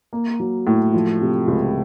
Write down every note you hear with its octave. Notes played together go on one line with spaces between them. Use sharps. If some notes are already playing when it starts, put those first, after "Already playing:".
A#3
F#3
A2
F3
C3
C#2